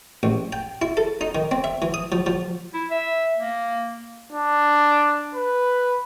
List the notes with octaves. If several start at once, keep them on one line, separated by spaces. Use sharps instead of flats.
A1
G5
E4
A4
D#4
D#3
C4
E5
E3
D#6
F3
F3
E4
E5
A#3
D4
B4